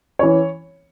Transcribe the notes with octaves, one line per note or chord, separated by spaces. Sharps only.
E3 C#4 C#5